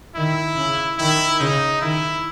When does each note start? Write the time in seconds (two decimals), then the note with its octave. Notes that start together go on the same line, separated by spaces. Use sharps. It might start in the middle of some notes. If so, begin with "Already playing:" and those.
0.15 D#3 E4
0.57 C#3
0.98 D#3 E4
1.39 C#3 D#4
1.81 D#3 E4